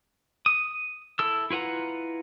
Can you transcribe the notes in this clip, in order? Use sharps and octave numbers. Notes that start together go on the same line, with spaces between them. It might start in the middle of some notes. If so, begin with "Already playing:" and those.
D#6
E4 A4 E6
E4 F4 B4 F#5 A#5